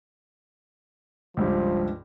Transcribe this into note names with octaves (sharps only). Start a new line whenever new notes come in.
C#2 G2 F3 G4